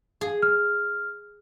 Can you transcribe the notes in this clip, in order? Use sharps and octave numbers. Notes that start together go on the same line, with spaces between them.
G#4
F6